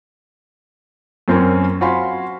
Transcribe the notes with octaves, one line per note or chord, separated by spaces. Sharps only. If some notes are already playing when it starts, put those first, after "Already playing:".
F#2 C4 C#4 A#4 G#5
F#4 C5 F5 G#5 B5 C6